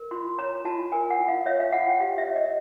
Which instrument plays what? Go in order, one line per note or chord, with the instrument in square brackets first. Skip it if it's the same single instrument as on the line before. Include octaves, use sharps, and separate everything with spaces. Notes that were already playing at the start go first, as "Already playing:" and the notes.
Already playing: [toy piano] A#4
F4 C6
C#5 A#5
F4 A5
A#4 G#5
F#5
F4
F5
C#5 E5
F5
F4 F#5
G5
G4 F5
E5
C#5
D#5